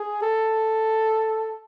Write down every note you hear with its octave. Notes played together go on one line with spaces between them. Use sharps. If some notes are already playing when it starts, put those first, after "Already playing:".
Already playing: G#4
A4